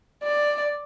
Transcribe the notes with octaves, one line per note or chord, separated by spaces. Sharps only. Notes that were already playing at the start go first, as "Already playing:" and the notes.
D5